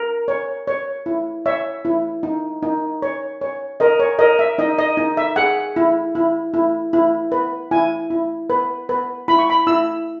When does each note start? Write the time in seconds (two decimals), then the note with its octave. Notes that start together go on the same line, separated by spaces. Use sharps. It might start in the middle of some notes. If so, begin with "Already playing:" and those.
Already playing: A#4
0.28 C#5
0.67 C#5
1.06 E4
1.46 C#5 E5
1.85 E4
2.23 D#4
2.63 D#4
3.02 C#5
3.41 C#5
3.80 A#4 D#5
4.00 C#5
4.19 A#4 D#5
4.39 E5
4.58 D#4 D#5
4.79 D#5
4.97 D#4
5.17 E5
5.36 G#4 F#5
5.76 E4
6.15 E4
6.54 E4
6.93 E4
7.32 B4
7.71 E4 G#5
8.10 E4
8.50 B4
8.89 B4
9.28 E4 B5
9.39 C#6
9.50 B5
9.67 E4 E6